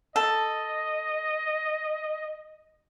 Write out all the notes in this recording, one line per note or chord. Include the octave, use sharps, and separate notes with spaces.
A4 D#5